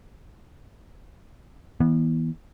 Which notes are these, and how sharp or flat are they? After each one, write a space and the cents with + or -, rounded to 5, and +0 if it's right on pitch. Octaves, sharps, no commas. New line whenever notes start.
E3 -30 B3 -25